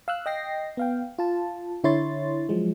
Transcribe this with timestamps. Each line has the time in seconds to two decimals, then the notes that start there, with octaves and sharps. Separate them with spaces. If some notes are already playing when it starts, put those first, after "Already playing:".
0.08 F5 E6 F#6
0.26 D#5 G5 A#6 C7
0.77 B3 F5 G5
1.18 F4 A5
1.84 D3 E4 C#5 C6 A6
2.49 F3 F#3 G#3